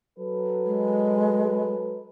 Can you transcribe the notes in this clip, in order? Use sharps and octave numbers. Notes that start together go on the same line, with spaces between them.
F#3 A4 B4
G#3